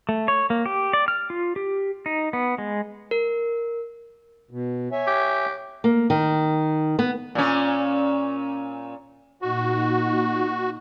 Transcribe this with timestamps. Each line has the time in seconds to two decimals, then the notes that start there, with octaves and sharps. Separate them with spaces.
0.09 A3
0.28 C#5
0.50 A#3
0.66 G4
0.93 D5
1.08 F6
1.30 F4
1.56 G4
2.06 D#4
2.33 B3
2.58 G#3
3.11 A#4
4.51 B2
4.92 C#5 E5 G#5
5.07 G4
5.84 A#3
6.10 D#3
6.99 B3
7.35 A#2 C#4
9.42 A#2 D#4 F#4